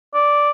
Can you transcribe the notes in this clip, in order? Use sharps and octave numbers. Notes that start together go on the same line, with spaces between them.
D5